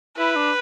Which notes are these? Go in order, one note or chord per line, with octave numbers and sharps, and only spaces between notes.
E4 B4
D4